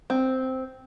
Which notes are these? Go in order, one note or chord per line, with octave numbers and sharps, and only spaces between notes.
C4